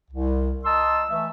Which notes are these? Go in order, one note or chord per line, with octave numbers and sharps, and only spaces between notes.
C2
D#5 A5 A#5 C6 D#6 E6
E3 A3 E5